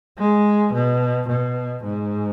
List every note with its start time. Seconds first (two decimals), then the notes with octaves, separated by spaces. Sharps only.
0.18 G#3
0.74 B2
1.28 B2
1.84 G#2